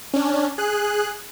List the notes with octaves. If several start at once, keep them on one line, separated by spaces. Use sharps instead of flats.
C#4 D4
G#4 F#6